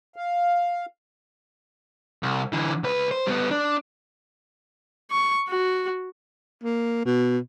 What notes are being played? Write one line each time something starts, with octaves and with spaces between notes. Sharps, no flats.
F5
C2
D3 E3
C#2 B4
C5
G3 B3
D4
C#6
F#4
A#3
B2